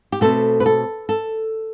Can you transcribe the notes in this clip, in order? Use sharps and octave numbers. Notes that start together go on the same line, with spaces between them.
G4
B2 A3 C4 A4
B4
A4
A4